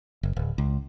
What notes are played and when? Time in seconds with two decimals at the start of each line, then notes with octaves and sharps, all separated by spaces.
0.23 F#1
0.36 D1
0.58 C#2